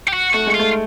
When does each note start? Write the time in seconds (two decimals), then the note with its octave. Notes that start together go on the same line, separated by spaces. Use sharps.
0.08 G4
0.13 F#4
0.34 A3 F#4
0.47 G#3
0.54 F4
0.59 A3